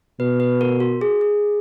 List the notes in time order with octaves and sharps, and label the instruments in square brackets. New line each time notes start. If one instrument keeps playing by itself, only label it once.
[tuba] B2 [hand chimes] B4
[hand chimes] B4
A#4
F#4
G#4
G#4